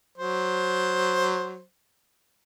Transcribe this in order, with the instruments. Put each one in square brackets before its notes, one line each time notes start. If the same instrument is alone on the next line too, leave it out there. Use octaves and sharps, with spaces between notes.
[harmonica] F#3 C5